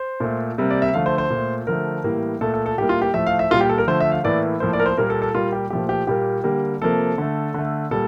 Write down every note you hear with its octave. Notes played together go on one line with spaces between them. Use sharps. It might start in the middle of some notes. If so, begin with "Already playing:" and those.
Already playing: C5
A#2 A3
C3 G3 A#3
D5
E5
D3 F3 A3 F5
C5
C5
A#2
A3
D3 F3 A3 A#4
A2 E3 G3 A#3
A#2 A3 A4
A4
A4
A2 G3 A#3 G4
F4
G4
A2 F3 A3 E5
F5
E5
A#2 G3 A#3 F4
G4
A4
A#4
D3 F3 A3 C5
E5
F5
A2 E3 A#3 D5
A2 F3 A#3 C5
D5
A#4
C5
A#2 G3 A#3 A#4
A4
A4
A#2 G3 A#3 F4
G4
A#2 F3 A3 G4
G4
A#2 G3 A#3 G4
D3 G3 A#3
C3 F3 A#3 A4
D3 A3
D3 A3
A#2 G3 A4